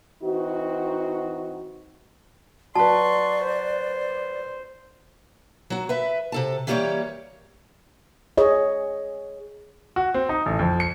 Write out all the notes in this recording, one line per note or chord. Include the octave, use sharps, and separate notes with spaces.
E3 C4 D#4 F#4
F#3 B4 D5 A5 C6 C#6
C5
F#3 F#4
B4 E5
C3 A4 A5
E3 G3 A#3 G4 B4 C#5
G#4 C#5 D#5
F#4
C4
D#4
A1
F2
C#7